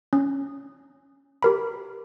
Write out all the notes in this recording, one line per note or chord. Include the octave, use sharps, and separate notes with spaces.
C#4
G4 A#4 B5